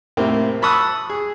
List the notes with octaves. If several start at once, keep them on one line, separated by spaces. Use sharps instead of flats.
A2 C3 A#3 C4
A5 B5 C#6 D#6 E6 F#6
G#4